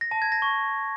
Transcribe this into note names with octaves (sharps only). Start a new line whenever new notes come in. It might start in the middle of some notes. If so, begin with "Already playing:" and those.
A#6
A5
G#6
A#6
C#6